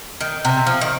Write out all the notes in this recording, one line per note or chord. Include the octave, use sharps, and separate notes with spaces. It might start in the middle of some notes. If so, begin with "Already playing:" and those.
D#3
C3
F3
D#3